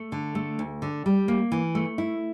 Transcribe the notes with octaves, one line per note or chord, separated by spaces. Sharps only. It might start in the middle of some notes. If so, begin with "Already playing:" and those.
Already playing: A3
D3
A3
D2
D3
G3
A#3
E3
A3
E4